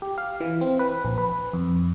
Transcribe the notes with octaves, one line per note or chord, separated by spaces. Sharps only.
G4
F5
E3
C4
B4
A#1
B4
F2